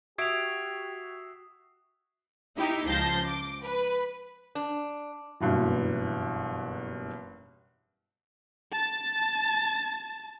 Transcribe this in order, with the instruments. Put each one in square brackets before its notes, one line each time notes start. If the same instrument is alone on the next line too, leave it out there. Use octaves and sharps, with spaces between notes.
[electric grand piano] F#4 E5 D7 [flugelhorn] G4 [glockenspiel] D#6 C7 [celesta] G#6 F7
[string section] D#4 E4 G4
C#2 F3 A5 G6 A#6 C7
D6
B4
[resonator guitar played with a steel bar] D4
[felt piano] F#1 G2 B2 E3
[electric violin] A5 A6